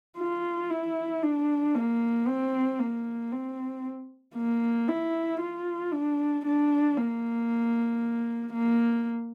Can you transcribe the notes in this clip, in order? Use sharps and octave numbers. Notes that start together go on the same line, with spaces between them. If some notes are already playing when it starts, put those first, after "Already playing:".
F4
E4
D4
A#3
C4
A#3
C4
A#3
E4
F4
D4
D4
A#3
A#3